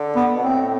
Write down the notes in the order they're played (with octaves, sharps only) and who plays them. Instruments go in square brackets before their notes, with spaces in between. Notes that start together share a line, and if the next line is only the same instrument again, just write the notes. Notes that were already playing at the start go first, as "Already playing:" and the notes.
Already playing: [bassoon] D3
[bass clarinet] B3
[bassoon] B2
[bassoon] A2 [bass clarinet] C4